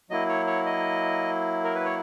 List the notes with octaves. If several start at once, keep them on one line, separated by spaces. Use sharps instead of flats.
F#3 A#3 E4 D#5
C#5
C#5
D#5
A#4
B4
C#5